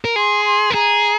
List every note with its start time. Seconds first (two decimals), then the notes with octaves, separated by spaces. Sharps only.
0.05 A#4
0.16 G#4 C6
0.45 C6
0.70 A#4
0.74 G#4 A#5